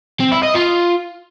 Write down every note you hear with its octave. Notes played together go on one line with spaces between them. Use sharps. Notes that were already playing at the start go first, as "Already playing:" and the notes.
C4
E4
D#5
F4